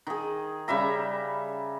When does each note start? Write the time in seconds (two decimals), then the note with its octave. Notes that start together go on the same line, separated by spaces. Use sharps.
0.07 D#3 G#4
0.68 C#3 G3 E5 A#5